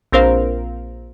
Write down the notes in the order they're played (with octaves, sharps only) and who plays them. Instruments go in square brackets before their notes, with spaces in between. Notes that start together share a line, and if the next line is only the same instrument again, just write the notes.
[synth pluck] A#1 C4 A#4 C5 F5